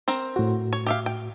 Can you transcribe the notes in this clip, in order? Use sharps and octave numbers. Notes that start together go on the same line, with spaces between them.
C4 A#4 C5
A2 F#4
C#5
G4 E5 F5
G5